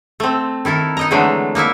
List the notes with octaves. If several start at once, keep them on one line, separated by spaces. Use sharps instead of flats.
A3 C4
D#3 E4 A4 A#4
D#4 D#5 A#5
D3 E3 F#3 G#3 A3
A#3 D#4 E4 E5